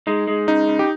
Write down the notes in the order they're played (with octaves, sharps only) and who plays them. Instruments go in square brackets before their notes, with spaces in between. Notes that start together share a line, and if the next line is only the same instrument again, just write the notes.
[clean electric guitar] G#3 [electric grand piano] D#4
[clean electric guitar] G#3
[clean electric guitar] C#3 [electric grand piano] D#4
[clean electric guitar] C#3
[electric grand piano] G4